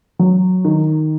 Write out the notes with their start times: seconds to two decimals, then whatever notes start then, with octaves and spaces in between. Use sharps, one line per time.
0.19 F#3
0.65 D#3